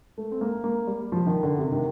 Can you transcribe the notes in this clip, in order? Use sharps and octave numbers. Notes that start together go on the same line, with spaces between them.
A3
C4
A#3
A#3
G3
F3
D#3
D3
C3
D#3